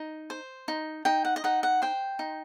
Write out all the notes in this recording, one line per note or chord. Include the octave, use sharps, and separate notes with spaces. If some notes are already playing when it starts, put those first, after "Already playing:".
Already playing: D#4
C5
D#4
D#4 G5
F#5
D#5
D#4 F#5
F#5
C5 G5
D#4